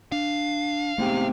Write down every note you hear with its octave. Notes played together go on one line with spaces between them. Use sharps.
D4 F5
G#2 C3 A3 B3